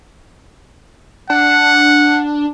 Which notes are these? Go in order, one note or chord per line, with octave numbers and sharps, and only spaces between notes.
D4 F#5